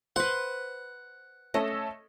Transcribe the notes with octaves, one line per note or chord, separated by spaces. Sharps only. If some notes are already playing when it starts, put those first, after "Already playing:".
B4 C5 F#5
A3 C#4 A4 D#5